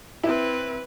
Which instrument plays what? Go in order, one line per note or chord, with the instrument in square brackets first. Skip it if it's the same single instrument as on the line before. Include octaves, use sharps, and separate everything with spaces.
[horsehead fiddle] C4 B4 [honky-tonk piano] E4